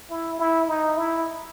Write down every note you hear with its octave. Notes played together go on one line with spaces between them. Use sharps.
E4
E4
D#4
E4